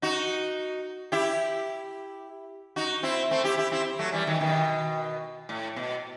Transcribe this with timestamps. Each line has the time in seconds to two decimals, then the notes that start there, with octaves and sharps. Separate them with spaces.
0.02 D#4 F#4
1.12 E4 G4
2.76 D#4 F#4
3.03 C4 E4
3.31 A3 C4
3.44 E4 G4
3.58 E4 G4
3.71 C4 E4
3.99 F#3 A3
4.12 E3 G3
4.27 D#3 F#3
4.34 E3
4.41 B2 D#3
5.49 A2
5.76 B2